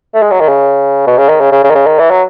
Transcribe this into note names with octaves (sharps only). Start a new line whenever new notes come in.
A3
G#3
F#3
D#3
C#3
B2
C#3
D#3
C#3
C#3
C#3
D#3
C#3
D#3
E3
F#3